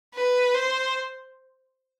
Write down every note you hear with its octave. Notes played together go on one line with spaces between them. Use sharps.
B4
C5